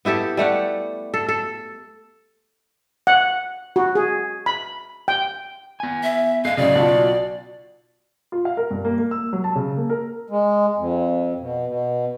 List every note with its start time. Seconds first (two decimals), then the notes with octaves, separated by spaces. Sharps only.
0.05 B3 E4 G4 A4
0.37 G3 A3 G4 F#5
1.14 A4
1.29 A4
3.07 F#5
3.76 F#4
3.95 G#4
4.46 B5
5.08 G5
5.80 B3 G#5
6.03 E5
6.45 G#4 A4 D#5 F5 C7
6.57 A2 C#3 F#3 D5 D#5
6.75 B1 F4 F#4 A5
8.32 F4
8.45 F5
8.57 A#4
8.71 G2
8.85 A#3
8.98 A#3
9.11 E6
9.33 F#3
9.44 A5
9.56 C#3
9.77 A#3
9.90 A#4
10.30 G#3
10.77 F2
11.39 B2
11.67 B2